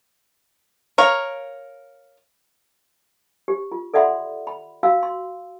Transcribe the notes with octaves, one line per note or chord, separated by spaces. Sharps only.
A#4 C#5 F5
G4
F4
A4 D5 E5 F#5 B5 C6
B5
F#4 F5 E6
C6